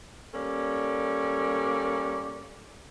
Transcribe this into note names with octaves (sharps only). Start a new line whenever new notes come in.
G3 A#3 C#4 A4 D5